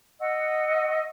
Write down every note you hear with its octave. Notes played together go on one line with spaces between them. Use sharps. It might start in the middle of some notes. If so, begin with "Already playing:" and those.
D#5 F#5 C#6 E6